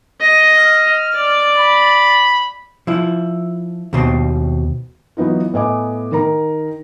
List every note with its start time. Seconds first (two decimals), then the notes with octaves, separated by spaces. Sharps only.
0.21 D#5
0.58 F6
1.14 D5
1.57 B5
2.87 F3 E4
3.93 D#2 B2 C4
5.17 E3 F#3 B3 D#4 F4
5.54 A2 B3 D#5 G#5 D6
6.12 D#3 A#4 A#5